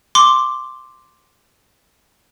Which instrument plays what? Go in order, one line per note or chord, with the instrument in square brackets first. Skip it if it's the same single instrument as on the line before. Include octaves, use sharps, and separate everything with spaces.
[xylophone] C6 D6